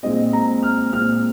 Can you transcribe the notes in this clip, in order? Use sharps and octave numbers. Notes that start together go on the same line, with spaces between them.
A#2 G#3 C4 D#5
A#5
F6
A#2 G#3 C4 F6